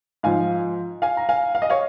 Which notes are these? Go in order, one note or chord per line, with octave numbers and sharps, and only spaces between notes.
G#2 F3 F5 G#5
F5 G#5
A#5
F5 G#5
F5
D#5
C#5 F5